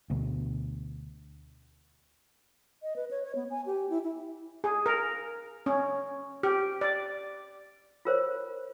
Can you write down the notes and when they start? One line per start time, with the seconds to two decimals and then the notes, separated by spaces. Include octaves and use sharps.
0.10 D2 B2
2.83 D#5
2.96 B4
3.11 C#5
3.24 C#5
3.35 B3
3.50 G#5
3.66 G4
3.90 E4
4.04 E4
4.64 G#4
4.86 A#4
5.66 C#4
6.43 G4
6.81 D5
8.05 F4 A#4 C5 C#5